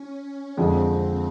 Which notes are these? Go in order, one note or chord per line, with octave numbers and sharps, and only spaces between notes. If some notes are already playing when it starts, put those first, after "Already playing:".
Already playing: C#4
C#4
F2 D3 F3 G#3 C4